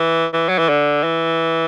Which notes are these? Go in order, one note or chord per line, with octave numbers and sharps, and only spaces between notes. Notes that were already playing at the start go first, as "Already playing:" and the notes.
Already playing: E3
E3
F#3
E3
D3
E3